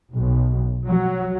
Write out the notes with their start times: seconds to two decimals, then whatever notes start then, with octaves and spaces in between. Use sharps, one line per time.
0.12 B1
0.85 F#3